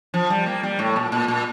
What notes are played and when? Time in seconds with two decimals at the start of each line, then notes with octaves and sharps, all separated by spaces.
0.14 F3
0.30 G3
0.46 A#3
0.63 G3
0.79 A2
0.96 A#2
1.12 A#2
1.28 A#2